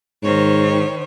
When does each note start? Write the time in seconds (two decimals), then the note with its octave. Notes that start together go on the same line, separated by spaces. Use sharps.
0.23 G#2 D#3 C5 C#5